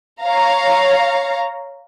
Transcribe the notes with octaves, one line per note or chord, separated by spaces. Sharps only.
C#5 F5 A#5